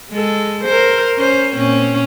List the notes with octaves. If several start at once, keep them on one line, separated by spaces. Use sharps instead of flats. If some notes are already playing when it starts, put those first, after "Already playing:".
G#3 A4
A#4 C5
C#4 C5
A#2 C4 C#4